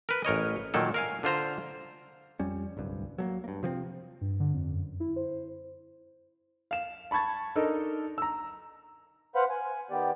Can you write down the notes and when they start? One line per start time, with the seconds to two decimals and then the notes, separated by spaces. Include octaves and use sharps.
0.09 A#4 B4
0.25 A1 A#4 C#5 D#5
0.74 A#2 D#3 F#3 A#3 A4
0.94 A#4 F5 G#5
1.23 D3 F4 C5 A#5
2.39 F2 G3 C#4
2.77 D1 C2 G2
3.18 F#3 A3 A#3
3.44 G2 A#3
3.63 C3 F3 G#3 C4
4.21 G2
4.40 D3
4.53 F2
4.73 F#2
5.00 E4
5.16 C5
6.71 F5 E7
7.11 A5 B5 C#6 G#6 A6
7.56 D4 D#4 A4 A#4 D#5
8.18 A#5 E6
9.35 B4 C5 F5 F#5 B5
9.50 G#5
9.90 D#3 B3 G4 D5